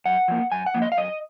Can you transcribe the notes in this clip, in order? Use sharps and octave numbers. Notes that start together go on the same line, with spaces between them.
F#2 F#5
F3 A#3
F#2 G#5
F#5
F3 A#3
D#5
F5
F#2 D#5